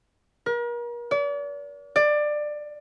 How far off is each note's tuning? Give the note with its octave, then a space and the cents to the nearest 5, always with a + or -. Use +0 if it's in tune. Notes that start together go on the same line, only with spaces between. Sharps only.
A#4 +40
D5 -40
D5 +20